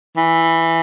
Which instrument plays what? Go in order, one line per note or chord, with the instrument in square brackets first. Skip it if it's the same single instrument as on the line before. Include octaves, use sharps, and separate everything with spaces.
[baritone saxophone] E3